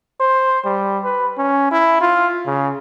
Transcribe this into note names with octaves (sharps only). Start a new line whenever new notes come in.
C5
G3
B4
C#4
E4
F4
C#3